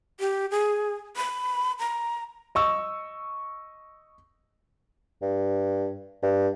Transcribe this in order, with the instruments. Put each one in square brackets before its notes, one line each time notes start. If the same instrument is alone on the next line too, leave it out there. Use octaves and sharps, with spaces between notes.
[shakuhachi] G4
G#4
B5
A#5
[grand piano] D#5 C#6 E6
[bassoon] G2
G2